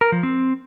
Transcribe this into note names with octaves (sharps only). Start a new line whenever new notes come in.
A#4
F3
C4